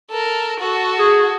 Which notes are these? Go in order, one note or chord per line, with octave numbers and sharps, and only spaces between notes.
A4 A#4
F#4 A4
G#4